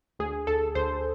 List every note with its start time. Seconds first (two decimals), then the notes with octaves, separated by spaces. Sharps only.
0.19 D2 G#4
0.47 D2 A4
0.75 D2 C5